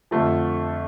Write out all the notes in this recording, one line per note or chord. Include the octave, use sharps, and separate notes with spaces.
F2 D3 F3 A3